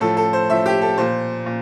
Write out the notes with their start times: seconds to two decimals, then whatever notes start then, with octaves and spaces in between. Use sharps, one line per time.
0.01 A2 F3 A4
0.17 A4
0.33 C5
0.49 A2 F3 E5
0.66 G4
0.81 A4
0.98 A#2 F3 C5
1.46 A#2